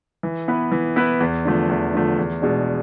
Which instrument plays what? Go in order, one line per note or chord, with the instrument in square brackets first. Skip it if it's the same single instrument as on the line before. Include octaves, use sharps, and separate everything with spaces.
[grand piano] E3
B3 E4 B4
E3
B3 E4 B4
E2
D3 F3 A3
E2
D3 F3 A3
E2
B2 G#3 D4